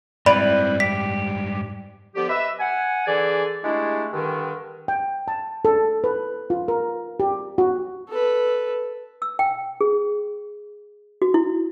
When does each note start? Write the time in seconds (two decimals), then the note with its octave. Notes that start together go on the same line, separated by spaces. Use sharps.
0.26 G#2 G3 C4 E4 B4 D5 B5
0.80 G4 B6
2.15 D3 F3 B3 G4
2.29 B4 D#5 E5
2.59 F#5 G#5
3.07 D3 E3 G#4 D5
3.63 G#3 A3 D4 E4 G4
4.12 G2 D3 D#3
4.88 G5
5.28 A5
5.65 A4
6.04 B4
6.50 F4
6.68 A#4
7.20 G4
7.58 F#4
8.09 A4 B4
9.22 E6
9.39 G5
9.81 G#4
11.22 F#4
11.34 E4